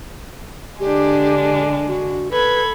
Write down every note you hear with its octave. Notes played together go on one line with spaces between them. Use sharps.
D3 G#3 D4 G4
F#4
A4 B4 B5 G#6